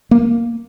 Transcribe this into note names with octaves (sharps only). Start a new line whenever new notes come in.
A#3